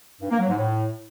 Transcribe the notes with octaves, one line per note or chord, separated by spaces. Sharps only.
G2
A#3
F#3
G#2
A2